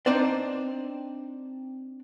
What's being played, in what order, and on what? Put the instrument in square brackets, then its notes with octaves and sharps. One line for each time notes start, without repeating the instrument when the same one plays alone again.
[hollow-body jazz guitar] C4 D4 D#4 C5 D5